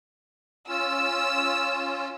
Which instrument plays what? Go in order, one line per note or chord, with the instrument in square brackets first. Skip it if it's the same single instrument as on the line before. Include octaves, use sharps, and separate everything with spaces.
[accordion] C#4 F4 [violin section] E6